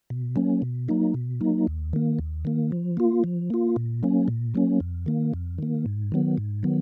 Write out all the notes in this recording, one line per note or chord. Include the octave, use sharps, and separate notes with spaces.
B2
F#3 A#3 C#4
B2
F#3 A#3 D#4
B2
F#3 A#3 D#4
D#2
D#3 A#3
D#2
D#3 A#3
F3
A#3 F4
F3
A#3 F4
A#2
F#3 A#3 C#4
A#2
F#3 A#3 C#4
F2
D#3 A#3
F2
D#3 A#3
G#2
D#3 F#3 B3
G#2
D#3 F#3 B3